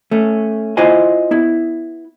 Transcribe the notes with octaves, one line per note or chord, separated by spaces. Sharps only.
A3 C#4
E4 F4 C5 D#5 G#5
B3 E4